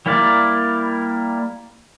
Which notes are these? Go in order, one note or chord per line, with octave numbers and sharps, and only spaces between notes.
G3 A#3 E4 A#4 D5